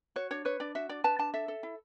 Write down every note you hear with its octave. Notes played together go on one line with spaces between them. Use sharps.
F#4 C#5
D4 C#5
B4 C#5
D4 D5
F#4 E5
D4 D5
B4 A5
D4 A5
A4 E5
A4
E4